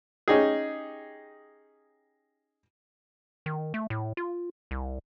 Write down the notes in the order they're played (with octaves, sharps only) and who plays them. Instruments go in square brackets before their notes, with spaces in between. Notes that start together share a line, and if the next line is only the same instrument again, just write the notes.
[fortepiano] C#4 D#4 G4 G#4
[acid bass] D#3
A3
A2
F4
C2